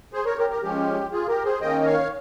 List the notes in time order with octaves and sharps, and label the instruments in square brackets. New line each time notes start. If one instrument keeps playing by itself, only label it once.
[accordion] G#4 C5
A#4 C#5
G4 A#4
G4 A#4
F3 G#3 C#4 G4
F4 G#4
G4 A#4
G#4 C5
D#3 A#3 C#4 D#5 G5
D#5
C#5 F5